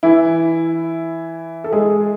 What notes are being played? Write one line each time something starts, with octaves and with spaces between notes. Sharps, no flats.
E3 E4
A4
G#3 G#4